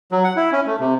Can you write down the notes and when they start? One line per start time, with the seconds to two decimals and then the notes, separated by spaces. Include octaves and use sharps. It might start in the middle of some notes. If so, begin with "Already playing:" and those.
0.12 F#3
0.24 F#5
0.36 E4
0.52 C#4
0.66 A3
0.80 C3